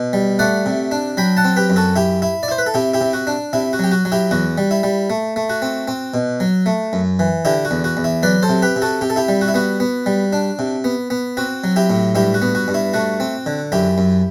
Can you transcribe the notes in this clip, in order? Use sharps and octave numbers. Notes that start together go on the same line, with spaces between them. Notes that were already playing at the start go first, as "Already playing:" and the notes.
Already playing: B2
G3
A3 D5 F#5
C3
D4
F#3 G5 B5
F#5 A5
C4
G4 B4
F#2
F#4 A4
E4 G4
E4
D5
E4 C5
B4
A4
C3 E4 G4
E4 G4
C3
F#4
D4
C3 E4
F#4
F#3 G4
F#4
F#3
E4 G4
E2 F#4
G3
E4
G3
A3
A3
F#4
C4
C4
B2
F#3
A3
F#2
E3
D3 E4 G4
F#4
E2
F#4
E2
E4
F#3 B4 D5
A4 C5
C3
G4 B4
C3
F#4 A4
C3 G4
A4
E4 G4
G3
F#4
E4
B3 F#4
B3
G3
D4
C3
B3
B3
C4 F#4
F#3
E4 G4
A2
G2 E4 G4
F#4
B3
F#4
G2
E4
A3 F#4
C4
D3
F#2 E4 G4
F#2